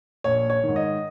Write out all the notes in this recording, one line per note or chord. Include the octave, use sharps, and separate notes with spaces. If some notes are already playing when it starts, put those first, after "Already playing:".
A#1 C#5
C#5
G#2 D#3
D#5